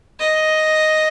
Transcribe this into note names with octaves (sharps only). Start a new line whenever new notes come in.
D#5